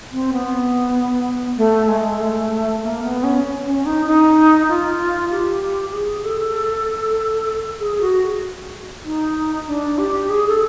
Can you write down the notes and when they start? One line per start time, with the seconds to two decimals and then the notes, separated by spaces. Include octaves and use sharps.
0.12 C4
0.33 B3
1.58 A3
1.89 G#3
2.20 A3
2.82 A#3
3.03 B3
3.24 C#4
3.65 C#4
3.86 D#4
4.06 D#4
4.69 F4
5.31 G4
5.89 G4
5.93 G#4
6.25 A4
7.80 G#4
8.01 F#4
9.05 D#4
9.67 D4
9.98 G4
10.29 G#4
10.48 A4